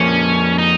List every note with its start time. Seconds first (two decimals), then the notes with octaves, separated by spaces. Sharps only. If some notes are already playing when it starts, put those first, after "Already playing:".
Already playing: F2 F3 A#3 C#4
0.58 D#4